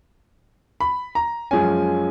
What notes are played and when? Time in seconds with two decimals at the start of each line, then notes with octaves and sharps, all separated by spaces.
0.80 B5
1.15 A#5
1.51 F#2 F3 G#3 C#4 G#5